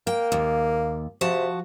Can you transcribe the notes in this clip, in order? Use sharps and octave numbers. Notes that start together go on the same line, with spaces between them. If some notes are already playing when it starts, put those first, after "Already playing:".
A#3 G5
D#2
C3 F3 F#4 A5